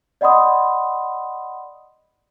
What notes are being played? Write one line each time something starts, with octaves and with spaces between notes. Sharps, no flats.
D5 D#5 F#5 B5 C6 D#6